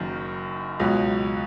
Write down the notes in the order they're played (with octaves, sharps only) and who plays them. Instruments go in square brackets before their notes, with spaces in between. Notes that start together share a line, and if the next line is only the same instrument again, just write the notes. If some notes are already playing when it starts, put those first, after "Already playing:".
Already playing: [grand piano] F#1 F#2 D#3
C#2 B2 F#3